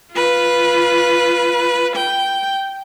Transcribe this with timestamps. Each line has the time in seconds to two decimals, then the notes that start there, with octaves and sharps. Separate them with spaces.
0.11 F4 B4
1.96 G5